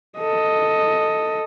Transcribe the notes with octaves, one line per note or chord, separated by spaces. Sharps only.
A4 D#5